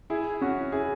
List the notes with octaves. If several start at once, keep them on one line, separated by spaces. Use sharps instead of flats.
E4 G#4
C#4 F#4
E4 G#4